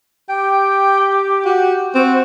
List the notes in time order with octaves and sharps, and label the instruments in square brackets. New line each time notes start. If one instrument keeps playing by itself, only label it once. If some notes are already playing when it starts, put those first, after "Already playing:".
[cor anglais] G4 [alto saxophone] G5
[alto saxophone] F#4
[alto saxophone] C4 [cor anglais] F#4